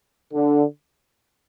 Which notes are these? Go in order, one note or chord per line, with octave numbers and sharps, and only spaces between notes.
D3